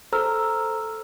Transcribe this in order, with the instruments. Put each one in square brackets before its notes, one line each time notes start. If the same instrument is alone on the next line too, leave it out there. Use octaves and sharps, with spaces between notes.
[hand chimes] A4 C5 A#5 E6 F6